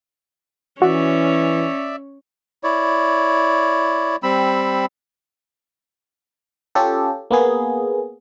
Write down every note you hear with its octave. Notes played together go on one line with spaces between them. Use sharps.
E3 C#4 F#4 C#5 D5 E5
E4 C#5 D5
G3 C4 B5 E6
C#4 F4 G4 A4
A#3 B3 G#4